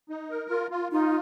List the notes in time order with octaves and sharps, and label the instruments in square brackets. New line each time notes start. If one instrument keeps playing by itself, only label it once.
[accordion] D#4
A#4
F4
F4
[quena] D#4 [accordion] F4